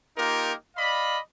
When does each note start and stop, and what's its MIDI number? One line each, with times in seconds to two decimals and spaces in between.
0.16 0.53 58
0.16 0.53 63
0.16 0.53 65
0.16 0.53 67
0.16 0.53 70
0.77 1.18 74
0.77 1.18 75
0.77 1.18 77
0.77 1.18 83